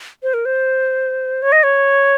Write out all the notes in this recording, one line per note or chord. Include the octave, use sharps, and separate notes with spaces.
C5
A#4
C5
C#5
D#5
C#5